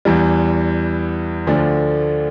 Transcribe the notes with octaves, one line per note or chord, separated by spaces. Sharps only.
E2 E3 G3
D2 D3 F3 A3 D4